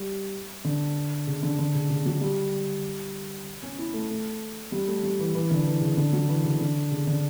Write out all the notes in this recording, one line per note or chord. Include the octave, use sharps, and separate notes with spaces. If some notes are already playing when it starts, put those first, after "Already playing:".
Already playing: G3
D3
C#3
D3
D3
C#3
C#3
F#3
G3
C#4
E4
A3
A3
G3
A3
G3
E3
E3
D3
E3
C#3
D3
F#3
E3
C#3
D3
C#3
D3